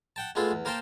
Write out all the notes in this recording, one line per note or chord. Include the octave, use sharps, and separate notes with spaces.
F#5 G5 A5
G#3 A3 B3 F4 G#4 A4
E2
A#3 A#4 C5 G5 A5